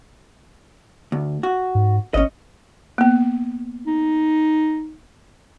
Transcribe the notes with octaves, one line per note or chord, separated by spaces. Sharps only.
D2
F#4
G#2
G#1 C#4 D#5
A#3 B3
D#4